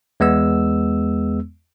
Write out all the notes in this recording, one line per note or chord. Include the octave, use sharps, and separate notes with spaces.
E2 G#3 B3 E6